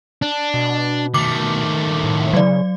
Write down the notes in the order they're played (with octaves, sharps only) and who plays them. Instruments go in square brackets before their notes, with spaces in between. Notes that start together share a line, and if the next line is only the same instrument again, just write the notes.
[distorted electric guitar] D4
[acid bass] B2
[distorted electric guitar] D#3 A3 [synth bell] D6
[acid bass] A2
[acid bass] C#3 [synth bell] F#3 D5